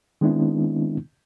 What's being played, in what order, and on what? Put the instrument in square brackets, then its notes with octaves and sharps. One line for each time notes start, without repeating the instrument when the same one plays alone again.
[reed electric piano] D#3 G#3 B3 C4 D4 E4